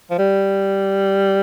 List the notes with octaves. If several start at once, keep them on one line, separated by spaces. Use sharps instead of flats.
F3
G3